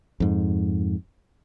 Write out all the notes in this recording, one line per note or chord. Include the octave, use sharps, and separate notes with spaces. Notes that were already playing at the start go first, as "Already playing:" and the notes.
F2 G#2